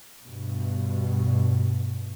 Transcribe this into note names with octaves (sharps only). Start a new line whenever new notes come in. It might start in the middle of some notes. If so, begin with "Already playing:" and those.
G2 B2